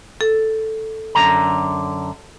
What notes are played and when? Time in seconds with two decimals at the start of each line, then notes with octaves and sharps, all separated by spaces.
0.21 A4
1.15 F#2 D3 A#5